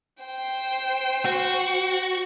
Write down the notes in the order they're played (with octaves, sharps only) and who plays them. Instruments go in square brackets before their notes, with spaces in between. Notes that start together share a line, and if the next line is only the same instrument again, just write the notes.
[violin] C5 G5
[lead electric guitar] F#4